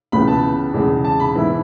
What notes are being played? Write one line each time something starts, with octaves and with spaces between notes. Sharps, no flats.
C#2 C#3 E3 B3 B5
A5
E2 C#3 G#3
A5
B5
G#2 E3 B3 E4